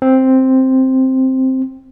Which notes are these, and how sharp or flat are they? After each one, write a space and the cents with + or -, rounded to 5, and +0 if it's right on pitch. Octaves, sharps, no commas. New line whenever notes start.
C4 +0